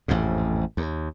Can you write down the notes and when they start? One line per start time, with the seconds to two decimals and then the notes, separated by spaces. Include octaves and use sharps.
0.08 A1 F2 G#2
0.77 D#2